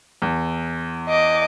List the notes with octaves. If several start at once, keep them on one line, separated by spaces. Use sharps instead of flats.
E2
D#5 D6